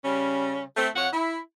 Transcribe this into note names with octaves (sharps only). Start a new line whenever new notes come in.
C#3 G3 C#4
A3 C4
F2 C#5 F#5
E4